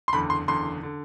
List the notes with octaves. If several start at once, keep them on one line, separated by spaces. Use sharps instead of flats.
C6
F#1 E2 D3 B5
C6
F#1 E2 D3 C6
D3